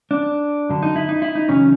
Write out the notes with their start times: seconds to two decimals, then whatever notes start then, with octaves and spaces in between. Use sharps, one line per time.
0.11 D4
0.70 F#2 D3
0.83 D#4
0.96 E4
1.09 D#4
1.22 E4
1.35 D#4
1.48 F#2 C#3 E3 C#4